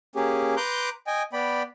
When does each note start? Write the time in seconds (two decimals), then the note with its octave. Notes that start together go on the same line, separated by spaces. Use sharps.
0.16 A#3 C#4 G4 G#4
0.57 B4 A#5 C6 D6 F#6 G6
1.07 D#5 G5 G#5
1.33 B3 D5 G5 B5